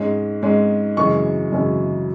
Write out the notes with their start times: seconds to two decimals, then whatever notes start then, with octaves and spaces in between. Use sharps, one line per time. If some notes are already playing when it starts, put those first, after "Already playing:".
Already playing: G#2 G#3 C#4
0.42 G#2 G#3 C#4
0.97 F#2 C#3 E3 G#3 C#6
1.52 F#2 C#3 E3 G#3